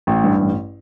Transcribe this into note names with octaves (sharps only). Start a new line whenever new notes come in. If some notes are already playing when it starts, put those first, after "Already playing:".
A1
G2
A1